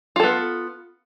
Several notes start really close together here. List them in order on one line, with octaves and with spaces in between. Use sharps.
F4 A4 B3